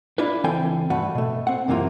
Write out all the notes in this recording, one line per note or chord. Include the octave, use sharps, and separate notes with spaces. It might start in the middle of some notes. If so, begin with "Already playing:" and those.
D4 E4 F4 B4
C#2 E3 C4 A4 G5 G#5
G2 A3 F#4 B4 F#5
B2 A3
C4 F#5
F#2 C3 E3 A#3 F4